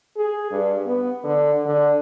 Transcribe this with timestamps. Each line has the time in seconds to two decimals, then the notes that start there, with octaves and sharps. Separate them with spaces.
0.17 G#4
0.51 G2
0.86 B3
1.24 D3
1.65 D3